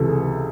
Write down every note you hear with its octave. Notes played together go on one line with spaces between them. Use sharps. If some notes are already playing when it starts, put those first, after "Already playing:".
Already playing: C#2 C3 E3 A4
G#4